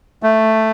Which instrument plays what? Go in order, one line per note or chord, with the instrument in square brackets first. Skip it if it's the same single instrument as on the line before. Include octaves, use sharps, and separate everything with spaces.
[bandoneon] A3